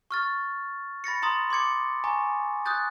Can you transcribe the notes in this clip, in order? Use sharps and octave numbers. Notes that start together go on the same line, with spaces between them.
C#6 F6 A6
B5 A6 A#6 C#7
A#5 C6 D#6 A6
C6 D6 G#6 C#7
G#5 A#5 C#6
D#6 F#6 G6 A6